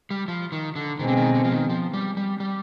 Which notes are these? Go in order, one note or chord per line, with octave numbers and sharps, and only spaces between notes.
G3
F3
D#3
D3
B2 D#3 G#3 C4
D3
D#3
D3
F3
D#3
F3
G3
G3
G3